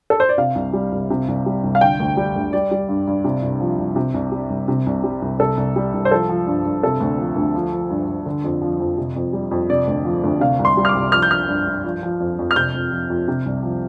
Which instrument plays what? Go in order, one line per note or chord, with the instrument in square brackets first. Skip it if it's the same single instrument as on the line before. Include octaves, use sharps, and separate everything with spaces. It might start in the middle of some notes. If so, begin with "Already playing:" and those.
[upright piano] A4
C5
D5
C3 F5
C2
G3
C2
C3
C2
G3
C2
F5
D3 G5
D2
G3
D2
G3 D5
G3
G2
G2
C3
C2
F3
C2
C3
C2
G3
C2
C3
C2
G3
C2
C3 A4
C2
G3
C2
C5
F3 A4
F3
G2
G2
C3 A4
D2
F3
D2
F3
F3
G2
G2
D3
F2
F3
F2
C3
F2
G3
F2
C3 D5
D2
F3
D2
C3 F5
C2
C6
G3
F6
D6
C2
F3 F6
G6
F3 F6
G2
G2
F3
F3
F2
F2
F6
C3 G6
F2
F3
F2
C3
C2
F3